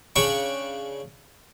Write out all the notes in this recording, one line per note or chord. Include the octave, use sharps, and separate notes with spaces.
C#3 D4 G5 C#6